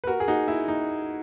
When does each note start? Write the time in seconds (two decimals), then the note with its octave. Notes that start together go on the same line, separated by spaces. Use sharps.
0.04 B4
0.07 F#4 A#4
0.20 G#4
0.28 D#4 F#4
0.48 E4
0.68 D#4